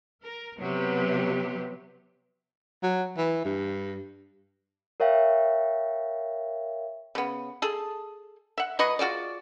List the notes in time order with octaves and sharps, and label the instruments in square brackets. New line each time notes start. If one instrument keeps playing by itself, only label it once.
[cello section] A#4
C3 F#3 B3 G4 B4
[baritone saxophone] F#3
E3
G2
[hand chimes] A#4 C#5 E5 F5 G5
[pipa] C#3 B3
G#4 A4
E5 F#5
F#3 B4 D#5 C#6
F4 F#4 G#4 D5